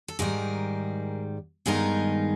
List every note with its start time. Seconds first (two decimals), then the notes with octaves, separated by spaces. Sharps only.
0.08 A4
0.19 G#2 D#3 G3 G#4 A#4
1.66 G2 D#3 G#3 B3 D#4 G#4 A#4